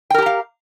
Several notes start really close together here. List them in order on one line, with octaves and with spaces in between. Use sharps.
G5 A#4 G4 A#5 F5